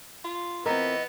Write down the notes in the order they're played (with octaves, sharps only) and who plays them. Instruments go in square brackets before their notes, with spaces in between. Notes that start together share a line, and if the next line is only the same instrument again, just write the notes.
[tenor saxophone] F4
[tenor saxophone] E3 [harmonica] B3 [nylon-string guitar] C4 F4 A#4 [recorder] D#5